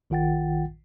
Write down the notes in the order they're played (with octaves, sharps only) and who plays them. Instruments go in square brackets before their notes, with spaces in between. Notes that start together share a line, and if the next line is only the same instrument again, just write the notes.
[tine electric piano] A#1 D#3 F4 F#5 G5 A6